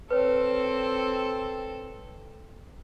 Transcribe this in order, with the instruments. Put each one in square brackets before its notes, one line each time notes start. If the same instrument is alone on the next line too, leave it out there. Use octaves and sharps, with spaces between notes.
[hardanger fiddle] C4 A4 [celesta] B4 C#5